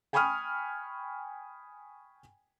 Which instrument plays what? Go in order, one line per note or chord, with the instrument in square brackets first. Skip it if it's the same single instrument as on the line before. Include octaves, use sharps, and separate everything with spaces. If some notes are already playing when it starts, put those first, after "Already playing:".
[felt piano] G5 G#5 B5 C#6 D#6 F6